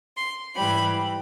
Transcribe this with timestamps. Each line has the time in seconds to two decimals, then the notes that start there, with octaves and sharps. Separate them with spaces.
0.17 C6
0.56 G#2 E3 G3 B5